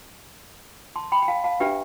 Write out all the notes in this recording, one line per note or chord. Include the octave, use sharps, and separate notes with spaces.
A5 C6
G5 B5
G5
F5 A5
F5 A5
D4 G4 B4 E5 G5